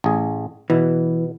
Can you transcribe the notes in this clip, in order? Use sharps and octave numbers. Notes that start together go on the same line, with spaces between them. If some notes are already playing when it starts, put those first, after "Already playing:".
A1 G#4
B2 E3